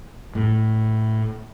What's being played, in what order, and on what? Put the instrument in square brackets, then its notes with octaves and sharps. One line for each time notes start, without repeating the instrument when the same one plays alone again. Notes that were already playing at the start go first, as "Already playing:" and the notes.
[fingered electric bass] A2